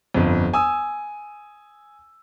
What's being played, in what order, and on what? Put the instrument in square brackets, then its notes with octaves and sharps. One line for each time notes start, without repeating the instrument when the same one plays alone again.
[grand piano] G1 F2
G#5 D#6 E6